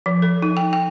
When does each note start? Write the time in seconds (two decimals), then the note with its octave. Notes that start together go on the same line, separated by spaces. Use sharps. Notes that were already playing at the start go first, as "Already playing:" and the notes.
0.06 F3
0.22 A4
0.42 D#4
0.57 G5
0.73 G5